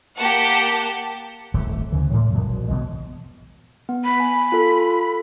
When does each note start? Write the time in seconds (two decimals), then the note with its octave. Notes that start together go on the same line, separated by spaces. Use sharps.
0.17 A#3 G4 F#5 A5
1.54 D#1 G#1 E3 A3
1.92 D2 C#3 E3
2.13 A2 E3 G#3 A#3
2.33 F#2 A#2 F#3 G#3
2.46 A#1 B2
2.68 B2 D3 E3 G#3
3.89 B3
4.04 B5
4.20 G#5
4.52 F4 A4